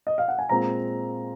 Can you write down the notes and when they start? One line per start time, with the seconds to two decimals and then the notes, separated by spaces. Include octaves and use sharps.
0.07 D#5
0.18 F5
0.28 F#5
0.39 G#5
0.49 A#2 G#3 C4 A#5